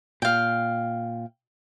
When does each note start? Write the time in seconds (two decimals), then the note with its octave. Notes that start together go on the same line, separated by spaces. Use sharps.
0.22 A#2 F5 G5